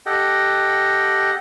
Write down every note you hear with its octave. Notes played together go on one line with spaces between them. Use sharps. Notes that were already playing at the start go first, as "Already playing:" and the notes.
G4 A4 D#5 F#5 G5